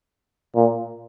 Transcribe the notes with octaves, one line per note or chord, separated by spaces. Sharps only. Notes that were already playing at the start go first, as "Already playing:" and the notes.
A#2